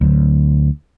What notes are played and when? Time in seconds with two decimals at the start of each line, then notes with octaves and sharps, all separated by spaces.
0.01 D2 F#3